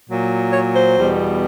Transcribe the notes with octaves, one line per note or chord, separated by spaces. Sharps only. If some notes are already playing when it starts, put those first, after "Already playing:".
A#2 F#3
C#5
C5
E2 B2 G3